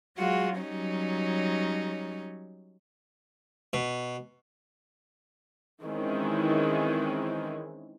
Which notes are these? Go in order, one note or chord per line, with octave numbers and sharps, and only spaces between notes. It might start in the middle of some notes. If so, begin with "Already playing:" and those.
F#3 G#3 F4 F#4
F#3 G3 C#4 D#4
B2
D#3 E3 G#3 C4 C#4 E4